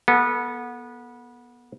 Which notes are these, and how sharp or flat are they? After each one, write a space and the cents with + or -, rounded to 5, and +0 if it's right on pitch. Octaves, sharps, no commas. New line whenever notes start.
B3 -25 A4 +0